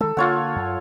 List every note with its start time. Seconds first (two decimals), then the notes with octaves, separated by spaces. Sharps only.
0.01 D#3 G#3 A4
0.17 D3 A#3 F4 C#5 F#5
0.56 F#2